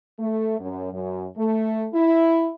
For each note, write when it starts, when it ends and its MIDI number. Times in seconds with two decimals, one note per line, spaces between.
0.19 0.60 57
0.60 0.90 42
0.92 1.26 42
1.37 1.87 57
1.94 2.53 64